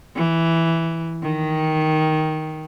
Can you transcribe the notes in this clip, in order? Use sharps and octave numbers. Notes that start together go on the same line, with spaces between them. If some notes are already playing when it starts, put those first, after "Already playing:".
E3
D#3